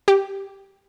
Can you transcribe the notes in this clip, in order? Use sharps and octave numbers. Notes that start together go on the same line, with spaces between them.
G4